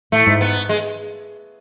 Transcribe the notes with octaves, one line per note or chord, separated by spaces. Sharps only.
A2 A3
G#2
B3
G#3